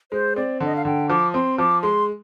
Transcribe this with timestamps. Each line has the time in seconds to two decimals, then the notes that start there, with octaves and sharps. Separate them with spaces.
0.12 G#3 C5
0.36 C4 D5
0.60 D3
0.65 D#5
0.76 F5
0.85 D3 G5
1.10 F3 D6
1.34 C4 C6
1.58 F3 D6
1.82 G#3 C6